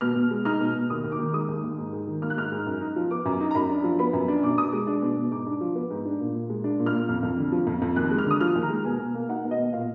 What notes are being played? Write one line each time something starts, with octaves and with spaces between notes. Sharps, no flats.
B2 F6
B2
G#3
D#4 F6
B2
B2
D#2 D#6
D#2
D6
D#3
G#3 D#6
D#2
D#2
G#2
G#2
D#3
A#3 F6
F#6
G#2 F6
G#2
F#2
D#4
F3
B3 D6
F#2
D#4
A#5
F#2 B5
D4
F3
B3 B5
F#2
D4
B2 D6
B2 D#6
G#3 D6
D4
B2
B2
G#2 D6
D4
F3
B3
G#2
D4
A#2
A#2
G#3
D4
A#2
F6
A#2
F2
F2
D3
F3
F2
F2
D#2 F#6
G#3
F6
D3 D#6
F3 F6
D#2
A#5
G#3
B2 G#5
B2
A#3
D#4 F#5
B2
D#5
B2
A#2 F5